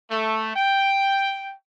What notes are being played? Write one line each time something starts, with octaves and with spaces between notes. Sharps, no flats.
A3
G5